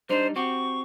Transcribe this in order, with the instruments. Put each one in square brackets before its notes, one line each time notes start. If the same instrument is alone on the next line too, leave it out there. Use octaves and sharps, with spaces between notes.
[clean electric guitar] G3 D4 D#4 [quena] C5
[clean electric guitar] C4 F#4 G4 [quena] C#6